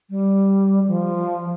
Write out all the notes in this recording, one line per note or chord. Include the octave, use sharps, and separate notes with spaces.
G3
F3